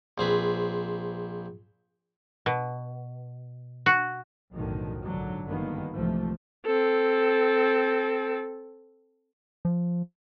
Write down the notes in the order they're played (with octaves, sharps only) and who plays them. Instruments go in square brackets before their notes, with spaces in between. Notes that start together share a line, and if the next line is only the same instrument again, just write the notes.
[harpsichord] A#1 C4 G#4 B4
[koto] B2
F#4
[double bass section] B1 F#2 A2 D3 D#3 F3
A#1 G#2 D3 F#3
G#1 G2 D3 D#3 A#3 B3
C2 G#2 E3 F3 A3
[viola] C4 A4
[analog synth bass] F3